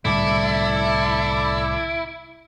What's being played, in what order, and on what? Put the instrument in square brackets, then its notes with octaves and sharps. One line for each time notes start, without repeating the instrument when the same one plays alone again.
[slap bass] C2 A2 D3 [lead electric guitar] E4 [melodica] A4 D5